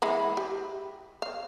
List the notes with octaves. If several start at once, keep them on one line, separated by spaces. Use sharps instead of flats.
E3 G#3 B5
G4
F5